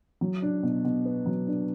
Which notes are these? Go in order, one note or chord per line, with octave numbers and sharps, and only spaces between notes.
F#3
D4
B2
B2
B3
F#3
D4